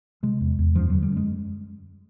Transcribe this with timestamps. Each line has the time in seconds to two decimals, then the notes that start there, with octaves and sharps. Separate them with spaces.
0.23 C3 G#3
0.40 E2
0.59 E2
0.75 F#2 F3
0.90 D3 F#3
1.03 G3
1.12 F#2 G#3